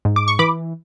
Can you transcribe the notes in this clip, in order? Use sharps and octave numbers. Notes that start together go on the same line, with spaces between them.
G#2
D6
C#6
E3 B5 D6